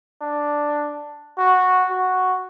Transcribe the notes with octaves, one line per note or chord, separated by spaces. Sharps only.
D4
F#4
F#4